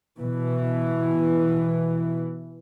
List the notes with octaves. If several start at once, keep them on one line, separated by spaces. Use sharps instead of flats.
B2 E3